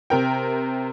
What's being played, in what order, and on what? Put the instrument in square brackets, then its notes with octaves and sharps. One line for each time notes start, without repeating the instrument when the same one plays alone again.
[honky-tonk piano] C3 A#4 G5